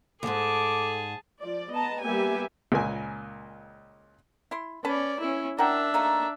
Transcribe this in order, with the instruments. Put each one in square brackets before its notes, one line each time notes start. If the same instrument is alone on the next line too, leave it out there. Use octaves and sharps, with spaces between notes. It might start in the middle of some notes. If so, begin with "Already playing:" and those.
[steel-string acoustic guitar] D#2 G#2 [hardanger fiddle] G#4 A5 [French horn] A4 [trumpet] D6
[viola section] F3 D5
B3 D#5 A5 A#5
G3 A#3 B3 G4 E5 G#5
[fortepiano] C#2 A#2 A#4 G#5
[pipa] E4 C6
[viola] C#4 D5 [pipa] B4 A5 B5
[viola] C#4 E4
[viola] D4 E5 [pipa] A#4 F#5 G5
[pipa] A3 A#3 D#4